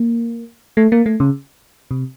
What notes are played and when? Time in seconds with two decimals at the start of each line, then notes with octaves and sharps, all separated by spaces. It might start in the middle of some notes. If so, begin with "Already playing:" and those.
Already playing: A#3
0.77 A3
0.92 A#3
1.06 A3
1.20 C#3
1.91 C3